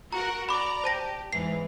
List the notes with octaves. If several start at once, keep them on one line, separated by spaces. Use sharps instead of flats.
F#4 A#4 F#5 A#5
D5 A#5 B5 D6
G4 C5 A5 A#6
E2 G#2 E3 C7